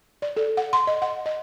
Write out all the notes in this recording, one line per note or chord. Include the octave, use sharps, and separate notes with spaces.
D5
A4
F#5
C6
D#5
F#5
D#5